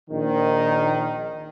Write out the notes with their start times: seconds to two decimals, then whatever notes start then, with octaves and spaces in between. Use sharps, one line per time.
0.10 A#1 D#3